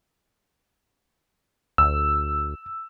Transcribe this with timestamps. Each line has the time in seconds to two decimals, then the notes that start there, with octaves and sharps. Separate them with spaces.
1.78 D2 E6